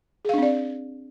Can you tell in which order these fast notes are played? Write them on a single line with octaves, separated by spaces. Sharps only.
G#4 F5 D4 C4 D5